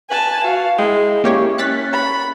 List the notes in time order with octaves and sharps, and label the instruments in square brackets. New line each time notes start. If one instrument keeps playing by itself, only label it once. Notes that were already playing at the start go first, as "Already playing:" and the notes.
[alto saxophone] B4 [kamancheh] G#5 A5
[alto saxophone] F#4 [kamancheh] F5
[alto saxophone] G#3 [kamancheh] E4 [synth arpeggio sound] G5
[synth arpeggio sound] A#3 G4 C#5 [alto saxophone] C#4
[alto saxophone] C#4 [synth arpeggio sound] F#6 A6 B6
[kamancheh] B5